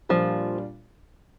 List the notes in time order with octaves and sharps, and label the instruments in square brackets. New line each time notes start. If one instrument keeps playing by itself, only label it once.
[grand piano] A#2 G3 D4 F4 [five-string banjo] F3